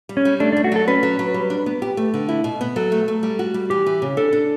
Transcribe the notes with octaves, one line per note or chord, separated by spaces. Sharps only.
G3
C#4
G3
A3 D4
D4
A3
F#4
F#3 A4
C#4 B4
F#3
F#3
G3
D4
B3
G4
A3
D3
E4
B2
B3
F#3 A4
A3
A3
G3
F#4
G3
E3 G4
E3
C#3
D4 A4
D4